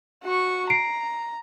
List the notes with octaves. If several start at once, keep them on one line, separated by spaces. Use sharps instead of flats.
F#4 C#6
A#5 C7 D7